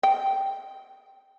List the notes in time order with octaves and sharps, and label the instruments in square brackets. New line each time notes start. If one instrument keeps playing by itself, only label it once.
[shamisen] G5